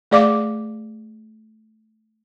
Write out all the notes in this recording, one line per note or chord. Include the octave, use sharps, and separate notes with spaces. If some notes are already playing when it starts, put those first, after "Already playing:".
A3 G#4 D5 F5 D6